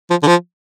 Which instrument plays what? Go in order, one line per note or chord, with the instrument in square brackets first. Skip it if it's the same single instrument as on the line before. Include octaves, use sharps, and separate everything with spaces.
[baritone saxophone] F3
D3
F3